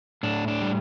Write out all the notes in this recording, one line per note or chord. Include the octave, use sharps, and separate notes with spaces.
A2 D4
D4
G3